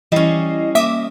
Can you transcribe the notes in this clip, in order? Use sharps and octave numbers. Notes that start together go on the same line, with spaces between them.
E3 G3 C#4 E4 D#5 C7
A#3 E5 D6 D#6